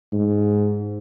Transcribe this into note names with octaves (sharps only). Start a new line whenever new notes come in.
G#2